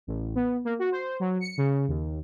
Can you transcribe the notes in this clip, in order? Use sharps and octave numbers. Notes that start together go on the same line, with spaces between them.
A1
B3
A#3
F#4
C5
F#3
C#7
C#3
D#2